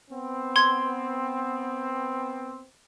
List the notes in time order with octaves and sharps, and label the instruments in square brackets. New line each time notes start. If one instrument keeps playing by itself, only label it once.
[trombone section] B3 C4
[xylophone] C6 G#6